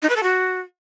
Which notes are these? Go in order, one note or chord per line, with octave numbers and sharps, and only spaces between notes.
D#4
B4
A4
F#4